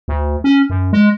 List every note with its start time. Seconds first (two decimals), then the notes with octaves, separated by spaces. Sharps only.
0.08 D2
0.44 C#4
0.70 F#2
0.93 G#3